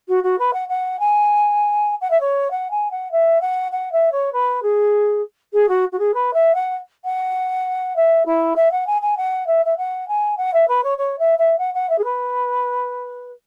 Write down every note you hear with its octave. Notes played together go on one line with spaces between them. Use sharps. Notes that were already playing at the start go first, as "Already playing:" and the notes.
F#4
F#4
B4
F#5
F#5
G#5
F#5
E5
C#5
F#5
G#5
F#5
E5
F#5
F#5
E5
C#5
B4
G#4
G#4
F#4
F#4
G#4
B4
E5
F#5
F#5
E5
E4
E5
F#5
G#5
G#5
F#5
E5
E5
F#5
G#5
F#5
E5
B4
C#5
C#5
E5
E5
F#5
F#5
E5
G#4
B4